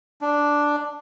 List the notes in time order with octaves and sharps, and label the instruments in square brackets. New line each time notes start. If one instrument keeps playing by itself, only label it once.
[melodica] D4